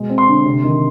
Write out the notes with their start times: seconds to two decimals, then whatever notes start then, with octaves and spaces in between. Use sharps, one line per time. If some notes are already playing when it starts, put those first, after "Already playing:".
Already playing: B2 G#3
0.10 C4
0.18 C6
0.28 D3
0.45 C3
0.64 D#3